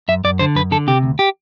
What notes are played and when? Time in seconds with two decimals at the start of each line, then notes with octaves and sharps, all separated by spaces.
0.08 F#2 E5
0.24 F#2 D5
0.39 D3 C5
0.55 F#2 B4
0.71 D3 A4
0.87 C3 G4
1.03 D2
1.19 G4